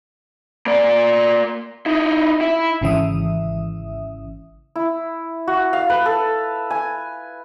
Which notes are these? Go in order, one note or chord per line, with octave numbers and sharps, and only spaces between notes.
A#3 D5
D#4 E4
E4
G#1 C#3 E3 E5 D#6
E4
F#4
F5
B4
A4
G#5